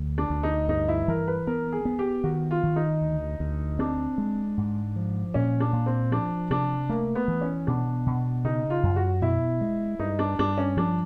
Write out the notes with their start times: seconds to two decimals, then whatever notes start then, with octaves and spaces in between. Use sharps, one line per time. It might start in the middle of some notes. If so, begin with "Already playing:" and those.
Already playing: D2
0.18 D4
0.30 D2
0.43 D#4
0.69 G2 D#4
0.88 E4
1.08 E3 A#4
1.28 B4
1.47 B3 A#4
1.72 G#4
1.85 B3
1.99 G4
2.24 D#3 F#4
2.51 F4
2.63 D#3
2.76 D#4
3.01 D2
3.40 D2
3.79 C4 D4
4.18 G#3
4.58 G#2
4.96 F3
5.34 A#2 C#4
5.60 D4
5.73 A#2
5.86 C4
6.11 F3 D4
6.50 C3 D4
6.89 A3 A#3
7.15 B3
7.28 E3
7.41 C#4
7.67 B2 D4
8.06 B2
8.45 C#3 D#4
8.70 F4
8.83 F#2
8.96 F#4
9.22 B2 E4
9.61 G#3
9.99 G2 D#4
10.19 D4
10.39 G2 D4
10.58 C#4
10.77 F3 D4